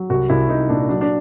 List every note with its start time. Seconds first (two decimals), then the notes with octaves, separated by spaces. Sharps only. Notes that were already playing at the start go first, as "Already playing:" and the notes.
Already playing: F#3
0.10 C2 F#4
0.30 C2 E4
0.49 C2 D#4
0.69 A#2 D4
0.89 F#3 D4
1.01 D4